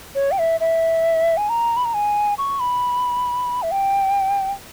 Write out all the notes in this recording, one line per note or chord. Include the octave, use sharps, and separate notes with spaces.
C#5
G5
E5
E5
G#5
A#5
B5
A#5
G#5
C#6
B5
E5
G5